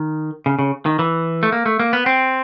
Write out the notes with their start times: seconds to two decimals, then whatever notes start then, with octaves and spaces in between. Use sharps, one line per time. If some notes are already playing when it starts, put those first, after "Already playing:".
Already playing: D#3
0.46 C#3
0.59 C#3
0.86 D#3
0.99 E3
1.43 A3
1.52 A#3
1.66 A3
1.79 A#3
1.93 B3
2.06 C4